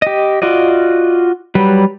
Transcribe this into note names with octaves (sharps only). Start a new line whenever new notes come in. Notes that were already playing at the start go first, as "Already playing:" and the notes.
G4 D#5
F4 F#4 D5 D#5
F#3 G3 B4